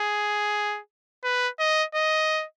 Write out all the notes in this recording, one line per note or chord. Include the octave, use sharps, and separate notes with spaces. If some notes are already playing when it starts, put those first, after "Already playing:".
Already playing: G#4
B4
D#5
D#5